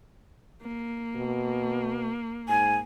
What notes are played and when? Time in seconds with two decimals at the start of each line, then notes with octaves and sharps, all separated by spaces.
0.62 A#3
1.16 B2
2.48 G#2 G#5